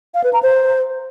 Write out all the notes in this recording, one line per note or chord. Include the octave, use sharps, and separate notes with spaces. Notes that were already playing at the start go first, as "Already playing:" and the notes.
F5
B4
A#5
C5